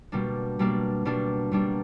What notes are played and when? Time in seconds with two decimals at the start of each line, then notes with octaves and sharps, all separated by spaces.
0.12 B2 G3 A#3 D4
0.59 B2 G3 A#3 D4
1.05 B2 G3 A#3 D4
1.52 B2 G3 A#3 D4